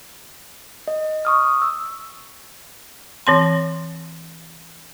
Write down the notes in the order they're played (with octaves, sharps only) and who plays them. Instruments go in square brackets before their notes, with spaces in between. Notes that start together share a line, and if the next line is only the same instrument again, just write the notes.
[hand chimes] D#5
C#6 D#6 F6
E6
[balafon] E3 C4 C6